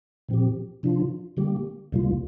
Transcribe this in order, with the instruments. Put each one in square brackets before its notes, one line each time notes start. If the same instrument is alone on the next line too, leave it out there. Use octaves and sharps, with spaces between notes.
[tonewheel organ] A#2 F3 C4 G4
C3 F3 D4 F4
D3 G3 A#3 G4
D2 C3 G3 A#3 F4